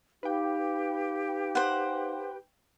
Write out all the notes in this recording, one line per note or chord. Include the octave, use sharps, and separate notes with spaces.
D#4 G4 B4 F5 G5 D6
C5 F#5